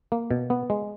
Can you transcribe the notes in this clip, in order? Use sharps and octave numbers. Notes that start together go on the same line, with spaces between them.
A#3
B2
B3
G#3